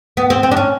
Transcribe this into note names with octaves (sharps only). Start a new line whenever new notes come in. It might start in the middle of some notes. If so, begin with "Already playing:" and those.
B3
C4
C4
D4
C#4